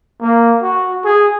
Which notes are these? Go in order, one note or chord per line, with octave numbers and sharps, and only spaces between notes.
A#3
F#4
G#4